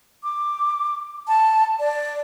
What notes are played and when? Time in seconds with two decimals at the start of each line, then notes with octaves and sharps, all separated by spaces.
0.23 D6
1.28 A5
1.79 D5